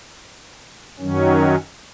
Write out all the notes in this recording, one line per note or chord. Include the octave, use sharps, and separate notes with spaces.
F#2 D#3 F#3 C#4